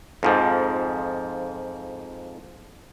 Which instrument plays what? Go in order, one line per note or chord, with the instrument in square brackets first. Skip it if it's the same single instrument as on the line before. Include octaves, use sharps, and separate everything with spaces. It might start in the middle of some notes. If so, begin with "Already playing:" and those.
[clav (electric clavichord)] F2 G#2 F3